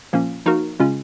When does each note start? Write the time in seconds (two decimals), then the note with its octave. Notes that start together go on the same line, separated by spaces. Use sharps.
0.13 A#2 F3 A#3 C#4
0.46 F3 A#3 D#4 F#4 A#4
0.79 C#3 G#3 C#4 F4